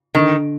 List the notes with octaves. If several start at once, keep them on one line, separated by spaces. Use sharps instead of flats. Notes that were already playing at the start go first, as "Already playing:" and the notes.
D3 D#3